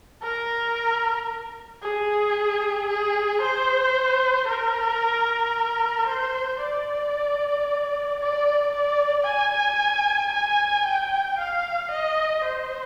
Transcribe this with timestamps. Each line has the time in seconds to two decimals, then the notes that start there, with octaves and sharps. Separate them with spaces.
0.23 A#4
1.83 G#4
2.89 G#4
3.42 C5
4.48 A#4
6.08 C5
6.60 D5
8.20 D5
8.73 D5
9.26 G#5
10.33 G#5
10.86 G5
11.39 F5
11.91 D#5
12.44 C5